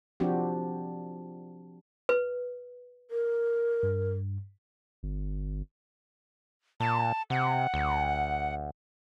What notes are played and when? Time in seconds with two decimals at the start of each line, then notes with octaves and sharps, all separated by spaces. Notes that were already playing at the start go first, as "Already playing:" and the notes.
0.20 F3 C4 D4 F#4 G4
2.09 B4
3.11 A#4
3.83 G2
5.03 G1
6.80 A#2 A5
7.30 C3 F#5
7.74 D2